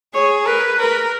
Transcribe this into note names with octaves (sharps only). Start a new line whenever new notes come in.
G#4 C#5
A#4 B4
A#4 B4